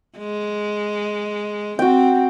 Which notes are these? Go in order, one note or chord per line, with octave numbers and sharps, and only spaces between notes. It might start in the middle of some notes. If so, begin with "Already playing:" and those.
G#3
C4 F#4 G5